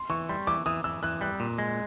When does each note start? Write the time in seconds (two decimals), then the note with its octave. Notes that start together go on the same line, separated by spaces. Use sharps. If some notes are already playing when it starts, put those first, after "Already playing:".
Already playing: C6
0.10 E3 C#6
0.29 G3 C6
0.47 E3 D6
0.66 E3 D#6
0.84 E3 E6
1.03 E3 F#6
1.21 G3 F#6
1.40 A#2
1.58 G#3